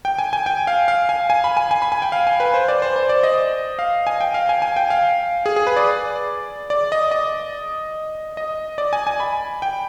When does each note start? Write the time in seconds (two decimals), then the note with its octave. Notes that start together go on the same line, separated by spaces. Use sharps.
0.05 G5
0.18 G#5
0.33 G#5
0.46 G5
0.67 F5
0.88 F5
1.09 G#5
1.30 G#5
1.44 B5
1.57 G#5
1.71 G#5
1.82 B5
1.92 G#5
2.02 G5
2.12 F5
2.27 G#5
2.40 B4
2.54 C5
2.68 D5
2.82 C5
2.96 C5
3.09 D5
3.23 D#5
3.79 F5
4.07 G#5
4.21 G5
4.34 F5
4.49 G#5
4.62 G#5
4.76 G5
4.90 F5
5.46 G#4
5.56 G#4
5.67 B4
5.76 D5
6.70 D5
6.92 D#5
7.11 D#5
8.37 D#5
8.78 D5
8.93 G#5
9.07 G#5
9.20 B5
9.62 G5